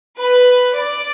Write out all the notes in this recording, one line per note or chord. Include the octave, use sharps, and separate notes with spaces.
B4
D5